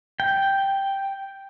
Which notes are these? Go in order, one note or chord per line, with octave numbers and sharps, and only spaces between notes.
G5